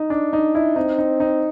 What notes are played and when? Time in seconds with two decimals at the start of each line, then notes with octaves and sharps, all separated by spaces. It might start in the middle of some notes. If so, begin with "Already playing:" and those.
Already playing: D#4
0.10 D4
0.33 D#4
0.55 E4
0.76 C4 D#4
0.98 D#4
1.20 D#4